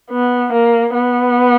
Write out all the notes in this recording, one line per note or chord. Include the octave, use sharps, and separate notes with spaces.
B3
A#3
B3